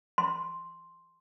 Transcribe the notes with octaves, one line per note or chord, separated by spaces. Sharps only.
C6